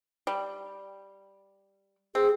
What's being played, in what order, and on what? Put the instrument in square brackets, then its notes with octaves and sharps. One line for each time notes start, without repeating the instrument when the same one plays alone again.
[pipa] G3
[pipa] C4 [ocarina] G#4